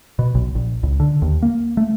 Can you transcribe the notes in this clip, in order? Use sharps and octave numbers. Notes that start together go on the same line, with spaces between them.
B2
B1
A#1
C#2
D3
D#2
A#3
A3